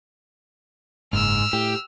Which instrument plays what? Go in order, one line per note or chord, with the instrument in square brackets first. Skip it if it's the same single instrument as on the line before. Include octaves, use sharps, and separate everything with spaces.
[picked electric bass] F#1 [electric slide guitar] G#2 [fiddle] E6 F6
[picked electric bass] A2 [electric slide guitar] G4